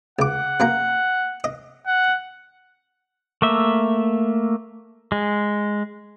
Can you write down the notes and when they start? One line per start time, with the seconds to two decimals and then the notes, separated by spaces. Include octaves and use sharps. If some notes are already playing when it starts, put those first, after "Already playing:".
0.19 C#2 F#5 D6
0.60 F#2 A#3 A#5
1.44 D#5
1.86 F#5
3.42 A3 A#3 E5
5.12 G#3